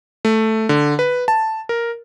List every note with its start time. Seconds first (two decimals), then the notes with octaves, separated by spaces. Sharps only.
0.25 A3
0.69 D3
0.99 B4
1.28 A5
1.69 A#4